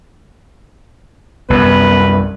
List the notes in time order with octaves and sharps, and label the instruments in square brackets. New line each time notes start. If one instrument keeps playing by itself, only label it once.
[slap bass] C2 F#2 [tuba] B3 [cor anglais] B4